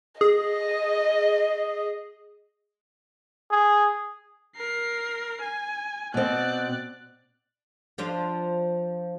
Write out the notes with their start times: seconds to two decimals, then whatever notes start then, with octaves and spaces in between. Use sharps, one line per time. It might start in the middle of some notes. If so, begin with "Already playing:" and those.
0.21 G#4 D#5
3.51 G#4
4.57 A#4 C7
5.41 G#5
6.14 B2 C4 D5 F#6
7.98 F3 D4 F4